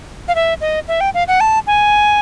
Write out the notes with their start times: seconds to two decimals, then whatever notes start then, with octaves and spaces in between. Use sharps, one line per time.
0.28 F5
0.35 E5
0.61 D#5
0.88 E5
1.01 G5
1.14 F5
1.28 F#5
1.40 A5
1.67 G#5